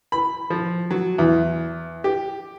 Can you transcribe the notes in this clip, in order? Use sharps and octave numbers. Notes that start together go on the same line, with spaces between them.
B5
F3
F#3
E2
G4